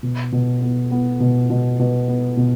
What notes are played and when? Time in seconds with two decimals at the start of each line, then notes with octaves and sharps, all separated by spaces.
0.03 B2
0.32 B2
0.62 B3
0.91 B3
1.20 B2
1.50 B2
1.79 B2
2.08 B3
2.37 B2